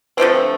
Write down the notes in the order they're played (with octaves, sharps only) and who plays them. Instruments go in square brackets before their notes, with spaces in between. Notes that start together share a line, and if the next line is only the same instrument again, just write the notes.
[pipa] D3 F3 A3 C4 [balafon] B4
[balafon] B4